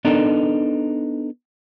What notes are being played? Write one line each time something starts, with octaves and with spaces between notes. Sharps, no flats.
B3 D4 D#4 A4 A#4